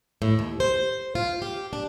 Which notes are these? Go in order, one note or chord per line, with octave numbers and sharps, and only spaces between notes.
A2
D#2
C5
F4
G4
D4